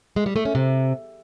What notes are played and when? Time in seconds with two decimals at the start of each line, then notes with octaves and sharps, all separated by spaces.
0.16 G#3
0.26 G3
0.36 A3
0.45 C#4
0.55 C3